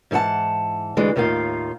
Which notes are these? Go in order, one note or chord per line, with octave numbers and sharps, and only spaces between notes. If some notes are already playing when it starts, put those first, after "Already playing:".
G#2 E3 A4 F#5 A5
D2 E3 G#3 D4
D#2 A2 D#3 F4 F5